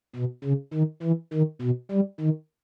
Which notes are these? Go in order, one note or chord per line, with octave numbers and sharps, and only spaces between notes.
B2
C#3
D#3
E3
D#3
B2
G3
D#3